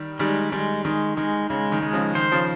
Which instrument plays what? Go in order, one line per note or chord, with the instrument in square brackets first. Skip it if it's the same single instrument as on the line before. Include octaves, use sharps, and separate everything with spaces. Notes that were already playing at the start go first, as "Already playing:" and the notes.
Already playing: [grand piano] D#3 G3
[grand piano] D#3 G3 [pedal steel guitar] G#3
[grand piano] D#3 G3 [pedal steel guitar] G#3
[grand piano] D#3 [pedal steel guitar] G#3
[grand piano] D#3 [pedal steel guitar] G#3
[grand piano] C#3 [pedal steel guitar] G#3
[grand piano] D#3
[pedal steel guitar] G#3
[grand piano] C#3 F3
[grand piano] D#3 [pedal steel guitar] C5
[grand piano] C#3 F3